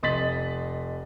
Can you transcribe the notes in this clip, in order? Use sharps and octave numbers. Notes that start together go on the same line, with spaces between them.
F1 D#5 C6 A6 B6 F#7